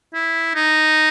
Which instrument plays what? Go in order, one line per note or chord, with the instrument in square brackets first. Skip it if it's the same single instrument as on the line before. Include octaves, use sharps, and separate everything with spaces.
[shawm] E4
D#4